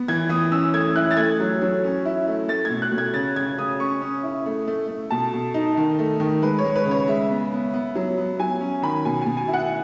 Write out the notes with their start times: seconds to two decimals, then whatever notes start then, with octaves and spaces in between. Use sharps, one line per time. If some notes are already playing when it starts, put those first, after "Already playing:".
Already playing: B3
0.08 E3 G#6
0.29 E3 D#6
0.51 C#4 E6
0.74 A3 G#6
0.96 E4 F#6
1.11 A6
1.17 A3 G#6
1.40 F#3
1.61 F#3
1.84 C#4
2.05 E4
2.27 A3
2.48 A3 A6
2.65 G#6
2.70 B2
2.82 F#6
2.92 B2
2.98 G#6
3.14 C#3 A6
3.36 C#3 G#6
3.58 C#3 D#6
3.80 C#4 C#6
4.01 C#4
4.23 E4
4.46 A3
4.68 A3
4.89 A3
5.10 B2 A5
5.34 B2
5.54 D#4
5.77 D#3
5.99 A3
6.20 D#3
6.42 G#3 B4
6.59 C#5
6.64 G#3
6.76 B4
6.85 C#3
6.91 C#5
7.08 G#3 E5
7.30 B3
7.52 B3
7.74 B3
7.96 F#3
8.18 B3
8.40 F#3 G#5
8.61 C#4
8.82 D#3 B5
9.05 B2 G#5
9.22 B2 G#5
9.37 G#5
9.48 E4
9.54 F#5